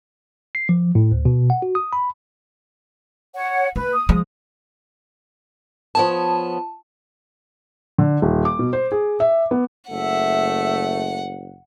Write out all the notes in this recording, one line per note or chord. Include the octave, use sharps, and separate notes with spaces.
C7
F3
A2
D2
B2
F#5
F#4
D#6
B5
C#5 F#5
A#3 B4
D#6
F3 G#3
F3 B3 C#5 A5
D3
D#1
D6
B2
C5
G#4
E5
B3
F#1 A3 E5 F#5